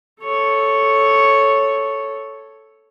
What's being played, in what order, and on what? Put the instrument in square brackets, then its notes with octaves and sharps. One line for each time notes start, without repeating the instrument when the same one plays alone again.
[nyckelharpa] A4 C#5